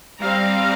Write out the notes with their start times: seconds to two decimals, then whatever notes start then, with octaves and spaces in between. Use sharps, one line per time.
0.20 G3 C4 F5 A#5